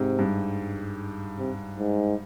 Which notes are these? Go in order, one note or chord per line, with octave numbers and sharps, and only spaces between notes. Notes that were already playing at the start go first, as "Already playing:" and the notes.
Already playing: G#2 C3
G2
C3
G#2